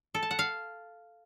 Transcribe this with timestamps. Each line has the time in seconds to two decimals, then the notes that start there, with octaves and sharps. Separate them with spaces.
0.15 A4
0.23 A5
0.31 F#5
0.39 F5